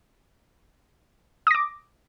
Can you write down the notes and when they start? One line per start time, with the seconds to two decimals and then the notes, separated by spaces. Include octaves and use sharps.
1.47 D#6
1.51 A#6
1.55 D6